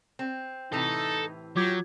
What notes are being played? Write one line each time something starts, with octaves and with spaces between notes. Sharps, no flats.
C4
A2 C3 E3 D#4 A4
F#3 F4 G4 D6 G#6